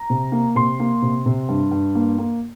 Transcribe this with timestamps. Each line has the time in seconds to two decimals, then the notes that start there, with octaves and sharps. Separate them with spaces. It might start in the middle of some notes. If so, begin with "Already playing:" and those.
Already playing: A#5
0.10 C3
0.32 A#3
0.55 C3 C6
0.80 A#3
1.02 C3
1.26 C3
1.49 G2
1.71 G2
1.95 A#3
2.18 A#3